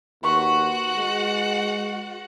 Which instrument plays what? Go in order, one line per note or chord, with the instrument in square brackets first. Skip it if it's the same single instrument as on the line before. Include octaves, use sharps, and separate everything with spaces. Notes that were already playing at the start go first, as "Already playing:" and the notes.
[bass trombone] D#2 [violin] F#4 F#5 [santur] B4 C6 C#6
[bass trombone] G#3